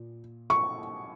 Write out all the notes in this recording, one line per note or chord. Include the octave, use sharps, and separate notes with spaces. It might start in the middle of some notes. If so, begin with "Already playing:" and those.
Already playing: A#2
C#6